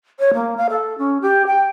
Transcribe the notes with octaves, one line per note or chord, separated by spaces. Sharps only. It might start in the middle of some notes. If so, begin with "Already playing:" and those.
C#5
A#3
F5
A4
C#4
G4
G5